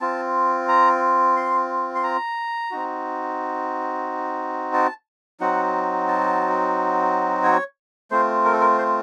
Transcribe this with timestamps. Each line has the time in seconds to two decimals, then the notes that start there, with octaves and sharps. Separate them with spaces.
0.01 C4 F4 A5
0.68 A#5
1.36 C6
1.95 C6
2.03 A#5
2.71 C4 D#4 F#4
4.73 A5
5.40 F#3 C4 D#4 F#4 F#5
6.08 A5
7.44 C#5
8.11 A3 C4 F4 C5
8.44 A#4
8.53 A4
8.61 A#4
8.78 C5